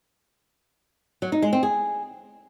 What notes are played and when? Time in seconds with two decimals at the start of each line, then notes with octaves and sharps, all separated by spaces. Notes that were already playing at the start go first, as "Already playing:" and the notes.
1.22 F#3
1.32 D#4
1.42 G#3
1.53 C4
1.63 G#4